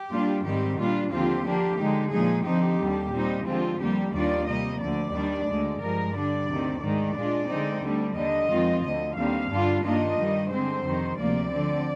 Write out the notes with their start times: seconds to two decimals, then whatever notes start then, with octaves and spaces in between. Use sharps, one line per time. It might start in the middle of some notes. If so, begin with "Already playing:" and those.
Already playing: G4
0.10 A#2 G3 D4 F4
0.44 G#2 D#3 G3 C4 G4
0.78 A#2 G3 D4 F4
1.10 D#2 D3 F3 C4 F4 G4
1.44 D3 F3 A#3 D4
1.78 D3 G#3 D#4
2.11 A#2 F3 G#3 D#4 G#4
2.45 D3 F3 C4 D#4 G4
2.79 D#2 D3 G3
3.13 A#2 G3 C4 D#4
3.45 D3 F3 G#3 C4 F4
3.80 F2 D3 G3 A#3 G4
4.13 D#2 D#3 G3 D4 F4 D5
4.46 C3 G3 A#3 D#5
4.79 D2 D3 F3 D5
5.13 D#2 D#3 G3 D4
5.47 D2 D3 G#3
5.80 G2 F3 G#3 A#4
6.14 D3 G3 D4 D5
6.47 D2 C3 D#3
6.81 G#2 D#3 G#3 D5
7.14 A#2 G#3 D4 F4
7.48 D3 G#3 C4 D#4
7.81 D2 D3 G3
8.16 D#2 D3 G3 D4 D#5
8.49 F2 D#3 G#3 C4 F4
8.82 D2 D3 F3 D#5
9.16 D#2 D3 G3 C4 F5
9.50 G2 D3 G3 D4 F4
9.83 G2 D#3 A#3 D4 F4 D#5
10.18 G2 D#3 G3
10.50 D3 G#3 C4 C5
10.84 F2 C3 D#3
11.18 D2 C3 F3 A#3 D5
11.51 D3 F3 C4